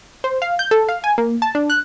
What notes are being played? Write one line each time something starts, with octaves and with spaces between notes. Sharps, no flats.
C5
F5
G6
A4
F5
G#5
A#3
A5
D4
F#6